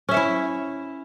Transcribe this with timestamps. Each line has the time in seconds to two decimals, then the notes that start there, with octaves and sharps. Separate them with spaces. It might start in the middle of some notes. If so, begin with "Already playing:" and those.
0.09 C#4
0.11 E5
0.14 C#5
0.17 E4